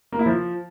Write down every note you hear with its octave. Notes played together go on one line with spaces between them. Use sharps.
A#3
E4
F3